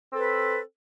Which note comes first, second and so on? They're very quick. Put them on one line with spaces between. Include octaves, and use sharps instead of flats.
C4 A4 B4